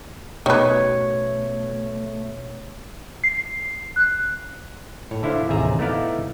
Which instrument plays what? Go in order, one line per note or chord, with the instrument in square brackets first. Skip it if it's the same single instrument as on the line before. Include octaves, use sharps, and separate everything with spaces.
[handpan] B2 C#5 [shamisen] D#3 B4 [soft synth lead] A3
[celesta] C7
F#6
[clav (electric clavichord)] A2 C#5
D3 E4 C5 F5
A1 D#2 C3 G#4 E5 A#5
A3 B3 D#4 E4 D5 F5